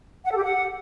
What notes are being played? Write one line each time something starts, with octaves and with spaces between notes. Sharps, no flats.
F#5
A4
G4
F#5